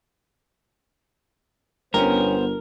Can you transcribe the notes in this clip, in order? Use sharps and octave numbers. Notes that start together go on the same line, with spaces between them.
G1 G2 B3 C#4 A#4 C5